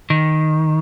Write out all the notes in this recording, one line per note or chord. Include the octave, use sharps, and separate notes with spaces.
D#3